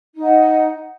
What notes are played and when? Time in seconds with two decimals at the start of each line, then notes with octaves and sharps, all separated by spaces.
0.15 D#4
0.19 D#5
0.24 F#5